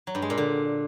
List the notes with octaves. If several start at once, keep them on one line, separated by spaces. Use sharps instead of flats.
F#3
G2
G#3
A#2
D3